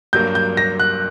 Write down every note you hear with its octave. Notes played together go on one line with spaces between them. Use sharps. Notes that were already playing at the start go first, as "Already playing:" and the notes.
G2 F#3 A#3 G6
G6
A#6
F#6